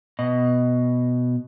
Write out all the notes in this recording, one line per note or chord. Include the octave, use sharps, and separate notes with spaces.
B2 D#5